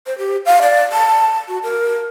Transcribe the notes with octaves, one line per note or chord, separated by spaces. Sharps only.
C5
G4
F5
D5
A5
F#4
A#4